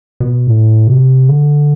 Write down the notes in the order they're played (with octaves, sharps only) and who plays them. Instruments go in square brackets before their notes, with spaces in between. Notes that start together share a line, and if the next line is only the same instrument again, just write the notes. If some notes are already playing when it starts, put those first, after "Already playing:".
[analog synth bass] B2
A2
C3
D3